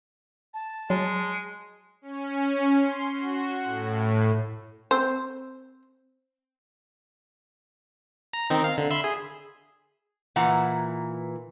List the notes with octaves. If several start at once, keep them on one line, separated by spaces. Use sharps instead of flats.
A5
F#3 G#3
C#4
C6
F#4
A2
C4 C5
A#5
D#3 C4 D#4
F5
D3
E5 B5 C6
G#4
A#2 E3 F#5 A#5